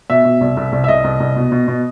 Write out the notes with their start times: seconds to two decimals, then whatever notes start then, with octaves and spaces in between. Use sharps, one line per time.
0.10 B2 E5
0.25 B2
0.41 C2
0.57 C2
0.72 C2
0.84 E5
0.88 C2 D#5
1.04 C2
1.20 C2
1.36 B2
1.52 B2
1.68 B2